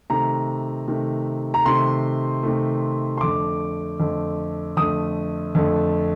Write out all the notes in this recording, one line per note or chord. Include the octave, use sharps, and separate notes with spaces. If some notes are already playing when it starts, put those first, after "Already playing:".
C3 D#3 A3 A#5
C3 D#3 A3
A#5
C3 D#3 A3 C6
C3 D#3 A3
C6
F2 D3 A3 D6
F2 D3 A3
F2 D3 A3 D#6
F2 D3 A3